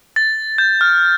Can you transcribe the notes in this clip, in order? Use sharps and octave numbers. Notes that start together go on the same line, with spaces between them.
A6
G6
F6